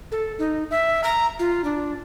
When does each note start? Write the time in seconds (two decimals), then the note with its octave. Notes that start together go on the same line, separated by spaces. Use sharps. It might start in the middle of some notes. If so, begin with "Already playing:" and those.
0.12 A4
0.39 D#4
0.71 E5
1.04 A#5
1.39 F4
1.64 D4